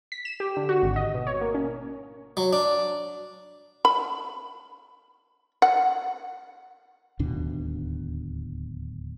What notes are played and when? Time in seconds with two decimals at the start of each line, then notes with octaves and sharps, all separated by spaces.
0.12 B6
0.25 E7
0.40 G4
0.57 D3
0.69 F#4
0.82 G#1
0.96 D#5
1.14 B2
1.27 C#5
1.41 A#3
1.55 C#4
2.37 F#3
2.53 D4
3.85 B5
5.62 F#5
7.19 D1 D#2 B2 D4